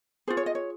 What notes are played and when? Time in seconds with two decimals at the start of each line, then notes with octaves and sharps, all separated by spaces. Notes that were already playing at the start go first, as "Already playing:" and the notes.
0.28 F4 G#4 C5
0.37 C#5
0.46 D#5
0.55 C#5